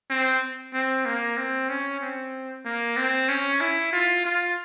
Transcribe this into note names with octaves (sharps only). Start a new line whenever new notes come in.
C4
C4
A#3
C4
C#4
C4
A#3
C4
C#4
E4
F4
F4